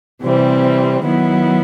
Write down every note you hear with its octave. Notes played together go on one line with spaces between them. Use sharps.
C3 E3 G3 C4
D#3 F#3 B3 E4